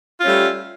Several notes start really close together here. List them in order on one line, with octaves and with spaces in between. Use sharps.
F4 C#4 A3 G3